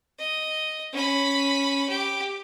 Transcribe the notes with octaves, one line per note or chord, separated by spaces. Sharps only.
D#5
C#4 B5
G4